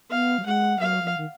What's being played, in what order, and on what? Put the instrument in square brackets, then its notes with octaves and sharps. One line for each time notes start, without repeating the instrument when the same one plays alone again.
[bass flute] B3 [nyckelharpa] F5
[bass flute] F#3
[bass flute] G#3 [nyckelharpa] F#5
[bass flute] F#3 [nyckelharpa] F5
[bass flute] F3
D#3